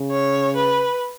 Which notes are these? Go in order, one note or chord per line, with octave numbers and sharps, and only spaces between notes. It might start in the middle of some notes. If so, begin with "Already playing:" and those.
Already playing: C#3
C#5
B4